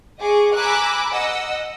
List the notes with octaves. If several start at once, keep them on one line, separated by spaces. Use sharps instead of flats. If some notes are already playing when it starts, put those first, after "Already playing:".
G#4 D#5 C#6 D6
G#5 A#5 B5 D6 E6 F#6
D#5 F#5 E6